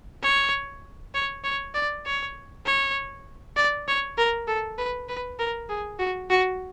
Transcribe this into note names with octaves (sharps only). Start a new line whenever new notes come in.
C#5
C#5
C#5
D5
C#5
C#5
D5
C#5
A#4
A4
B4
B4
A#4
G#4
F#4
F#4